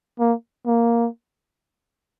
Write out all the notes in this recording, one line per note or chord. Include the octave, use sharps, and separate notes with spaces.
A#3
A#3